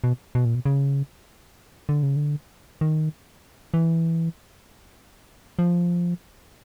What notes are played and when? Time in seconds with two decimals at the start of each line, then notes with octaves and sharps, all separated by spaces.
0.04 B2
0.35 B2
0.45 A#2
0.55 B2
0.66 C#3
1.89 D3
2.03 C#3
2.16 D3
2.81 D#3
3.74 E3
5.59 F3